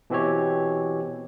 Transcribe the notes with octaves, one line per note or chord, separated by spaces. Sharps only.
B2 E3 C4 G4 C#5